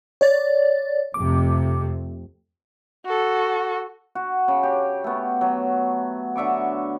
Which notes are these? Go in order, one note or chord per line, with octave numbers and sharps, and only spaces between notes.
C#5 D5 A6
F2 C3 A3 D6
F#4 A4
F#4
C#3
G4
A3 B3
F#3
D3 E5 C#6 D6